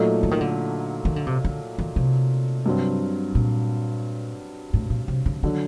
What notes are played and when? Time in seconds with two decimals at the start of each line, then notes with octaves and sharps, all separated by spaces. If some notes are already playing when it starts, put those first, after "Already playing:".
Already playing: A#2 F#3 A3 D#4 A4
0.23 D3
0.31 D#3
0.41 D3
1.05 D#3
1.16 D3
1.27 C3
1.44 D3
1.78 D#3
1.96 C3
2.66 G2 F#3 C4
3.35 A#2
4.73 A2
4.90 A#2
5.08 C3
5.26 D3
5.43 D3 D#3 F#3